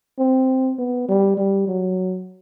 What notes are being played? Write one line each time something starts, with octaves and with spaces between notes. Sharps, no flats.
C4
B3
G3
G3
F#3